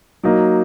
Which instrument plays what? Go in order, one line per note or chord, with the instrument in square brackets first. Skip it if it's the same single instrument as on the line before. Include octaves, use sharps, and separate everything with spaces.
[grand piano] F#3 A#3 D#4